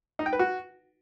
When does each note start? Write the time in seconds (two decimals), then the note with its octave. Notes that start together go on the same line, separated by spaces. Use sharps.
0.19 D#4
0.26 G5
0.33 B4
0.39 F#4